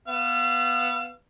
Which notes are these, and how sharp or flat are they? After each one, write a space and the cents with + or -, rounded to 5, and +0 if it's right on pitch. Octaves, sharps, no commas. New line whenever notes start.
B3 +0 F5 -5 E6 +45